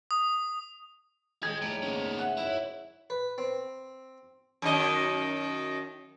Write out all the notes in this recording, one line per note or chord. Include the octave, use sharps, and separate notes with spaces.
D#6
D#1 G#4 D#5 G5 G#6
C#2 G#2 G3 A3 A#3 E4
B3 C#4
E5 F#5
F#1 E4 C#5 E5
B4
C4
F#2 D#3 D#5